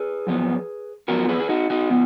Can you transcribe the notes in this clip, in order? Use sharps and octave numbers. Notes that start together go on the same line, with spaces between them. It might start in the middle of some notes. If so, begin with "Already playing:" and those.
Already playing: G#4 B4
F#2 F3 B3
F#2 F3 B3 F#4 A#4
G#4 B4
G#4
D#4 F#4
D#4 F#4
F3 B3